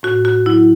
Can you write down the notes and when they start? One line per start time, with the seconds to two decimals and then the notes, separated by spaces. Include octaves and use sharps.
0.03 A2 F#4
0.25 F#4
0.46 F#3 E4